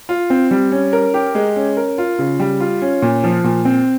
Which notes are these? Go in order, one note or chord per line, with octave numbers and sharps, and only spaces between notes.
F4
C4
G3
C#4
A#4
G4
G#3
C#4
A#4
F4
C#3
G3
F4
C#4
A#2
F3
A#2
C4